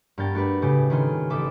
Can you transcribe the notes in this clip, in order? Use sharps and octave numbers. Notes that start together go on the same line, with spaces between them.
G2 B3 A#4 G5 A6
A3 F#4 G4 B4
A2 C#3 C#4 G4
D#3 C#4 F4
A1 A4 E5 D6 D#6